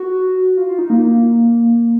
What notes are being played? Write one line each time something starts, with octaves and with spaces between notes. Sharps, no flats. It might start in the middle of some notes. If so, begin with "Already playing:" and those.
Already playing: F#4
F4
F4
D#4
A#3